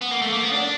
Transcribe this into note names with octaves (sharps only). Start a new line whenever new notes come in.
B3
A#3
A3
A#3
B3
D4